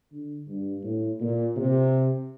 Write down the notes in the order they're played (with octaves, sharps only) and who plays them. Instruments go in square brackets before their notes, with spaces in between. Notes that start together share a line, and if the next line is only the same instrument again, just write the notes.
[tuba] D3
G2
A2
A#2
C3